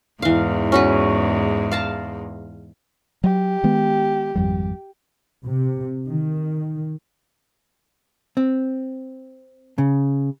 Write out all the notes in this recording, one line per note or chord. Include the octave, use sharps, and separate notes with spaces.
E2 G#2 E3 F5
C#4 F#4 B4
F5 A5 A#5
F#3 G4
D#3 G#3 B3
G#1 F2 G3
C3
D#3
C4
C#3